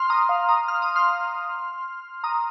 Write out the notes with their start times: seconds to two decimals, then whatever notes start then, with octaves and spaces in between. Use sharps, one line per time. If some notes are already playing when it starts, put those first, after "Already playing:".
Already playing: C6 F6
0.10 A#5 D#6
0.29 F5
0.49 A#5 D#6
0.68 F6
0.82 D#6
0.96 C6 F6
2.24 A#5 D#6